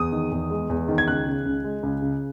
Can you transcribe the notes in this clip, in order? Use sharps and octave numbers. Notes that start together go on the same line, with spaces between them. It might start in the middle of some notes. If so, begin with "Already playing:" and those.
Already playing: E2 D#6
D#3
E2
G#3
E2
D#3
G#6
C#2 F#6
C#3
C#2
G#3
C#2
C#3